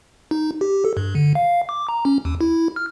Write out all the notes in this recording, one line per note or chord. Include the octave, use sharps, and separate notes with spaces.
D#4
G4
A4
G2
D3
F5
D6
A#5
C#4
D#2
E4
F6